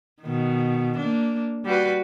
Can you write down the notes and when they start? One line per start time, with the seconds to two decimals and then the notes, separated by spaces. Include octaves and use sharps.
0.21 B2 D#3
0.97 A#3 D4
1.65 G3 F#4 B4